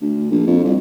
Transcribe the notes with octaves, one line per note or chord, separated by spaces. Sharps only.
D2
A#1
F2
C2